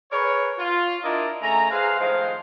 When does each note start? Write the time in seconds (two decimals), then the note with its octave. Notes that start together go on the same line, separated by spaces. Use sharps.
0.12 G#4 A#4 B4 C#5
0.59 F4
1.04 D4 E4 A#4 D5 D#5
1.42 C#3 A3 G#5 A#5
1.70 G#4 B4 C5 F5
1.99 A2 D#3 F3 G#3 C5 F5